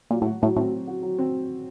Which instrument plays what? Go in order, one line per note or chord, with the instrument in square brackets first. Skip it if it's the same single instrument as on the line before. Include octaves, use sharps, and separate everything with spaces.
[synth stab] A#2 [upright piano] F#3
[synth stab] A2 [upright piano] F#4
[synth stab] A2 [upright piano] F#3
[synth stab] A2 [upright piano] C4
[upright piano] F#3
F#4
F#3
C4